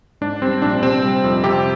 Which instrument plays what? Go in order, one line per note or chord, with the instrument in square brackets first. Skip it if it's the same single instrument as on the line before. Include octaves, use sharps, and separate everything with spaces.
[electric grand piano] G#2 D4
G3 C4
A#1 D4
C3 C4
G3
F2
C3 G4